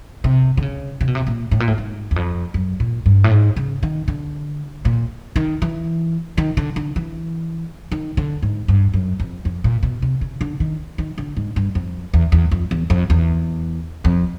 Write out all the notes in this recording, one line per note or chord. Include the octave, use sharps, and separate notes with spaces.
C3
D3
C#3
C3
B2
C3
A#2
A2
A#2
A2
G#2
E2
F2
F#2
A#2
G2
A2
G#2
C#3
D#3
D3
A#2
D#3
E3
D#3
D3
D3
E3
D#3
D3
G#2
G2
F#2
F2
F2
A#2
B2
C3
C#3
D3
D#3
D#3
D3
G#2
G2
F2
E2
E2
F2
E2
F2
E2
F2